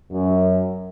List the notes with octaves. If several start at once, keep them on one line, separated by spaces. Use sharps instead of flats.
F#2